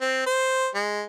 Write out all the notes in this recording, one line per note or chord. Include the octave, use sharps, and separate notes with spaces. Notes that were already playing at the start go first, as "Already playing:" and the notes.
C4
C5
G#3